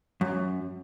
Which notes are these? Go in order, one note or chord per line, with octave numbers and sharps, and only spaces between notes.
F#2